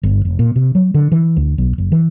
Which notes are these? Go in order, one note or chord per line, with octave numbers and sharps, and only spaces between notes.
G1
F1
A#2
C3
F#3
D3
E3
D2
B1
F#1
E3